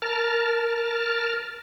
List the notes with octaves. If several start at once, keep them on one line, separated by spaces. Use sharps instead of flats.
A#4 A5 F6